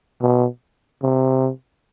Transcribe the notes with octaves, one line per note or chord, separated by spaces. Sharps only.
B2
C3